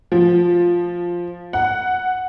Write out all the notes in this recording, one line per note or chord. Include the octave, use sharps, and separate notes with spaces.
F3
F#5